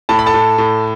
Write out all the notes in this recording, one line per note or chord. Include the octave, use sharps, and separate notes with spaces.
A2 A5
B5
A4 A5
A2
A2